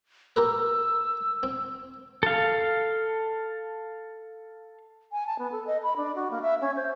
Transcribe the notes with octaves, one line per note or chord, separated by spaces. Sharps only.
G4 A#4 B4 E6
C4
A4 F5
G#5
A5
B3
A4
D#5
B5
D4
F#4
A#3
E5
C#4
C5